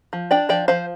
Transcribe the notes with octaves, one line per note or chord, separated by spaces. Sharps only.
F3
D4 D5 G5
F3 D5 G5
F3 C5 F5